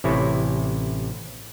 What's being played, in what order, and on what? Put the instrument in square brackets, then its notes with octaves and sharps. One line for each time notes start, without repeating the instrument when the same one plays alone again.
[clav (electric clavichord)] A1 C3 E4 C#5